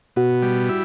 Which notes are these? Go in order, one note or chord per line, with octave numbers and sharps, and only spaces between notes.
B2 F#4
G3
E4